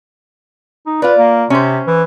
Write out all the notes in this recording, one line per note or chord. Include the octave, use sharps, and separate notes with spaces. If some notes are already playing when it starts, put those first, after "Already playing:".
D#4
F4 B4 D5
A#3
C3 C#4 C5
E3